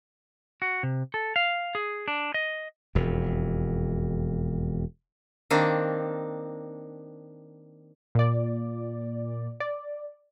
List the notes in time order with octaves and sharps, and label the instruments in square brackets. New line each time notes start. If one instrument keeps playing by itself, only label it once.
[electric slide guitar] F#4
C3
A4
F5
G#4
D4
D#5
[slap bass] E1 F2
[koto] D#3 A#3 C4 D4
[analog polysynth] A#2 D5
D5